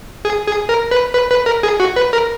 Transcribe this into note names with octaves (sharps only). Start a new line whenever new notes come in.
G#4
G#4
A#4
B4
B4
B4
A#4
G#4
F#4
B4
A#4